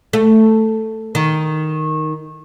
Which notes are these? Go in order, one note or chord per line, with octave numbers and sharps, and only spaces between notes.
A3
D#3